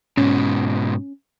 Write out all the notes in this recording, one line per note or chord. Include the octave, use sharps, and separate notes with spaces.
G#2 B2 C#4